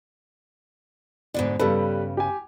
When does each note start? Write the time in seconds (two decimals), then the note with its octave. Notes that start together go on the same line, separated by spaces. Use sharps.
1.34 G#2 B2 D3 D5
1.59 G2 C#3 G3 A4 B4
2.17 G4 G#5